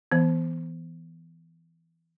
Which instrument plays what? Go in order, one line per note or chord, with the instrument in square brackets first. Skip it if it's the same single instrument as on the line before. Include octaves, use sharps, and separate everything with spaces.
[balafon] E3 B3